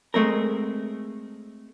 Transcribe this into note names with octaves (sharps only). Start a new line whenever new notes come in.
G#3 A3 C4 A#4